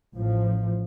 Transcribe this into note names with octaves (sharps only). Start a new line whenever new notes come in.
A1 A2 F3